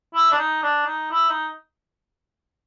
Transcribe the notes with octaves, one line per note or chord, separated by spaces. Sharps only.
E4
D4
D#4
D4
D#4
E4
D#4